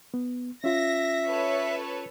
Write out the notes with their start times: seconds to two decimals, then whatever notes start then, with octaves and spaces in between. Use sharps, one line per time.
0.14 B3
0.64 C#4 F4 E5 A#6
1.26 A4 B4 C#5